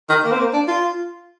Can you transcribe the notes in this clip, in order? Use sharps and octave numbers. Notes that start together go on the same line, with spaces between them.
D#3
A#3
C4
A#3
D4
F4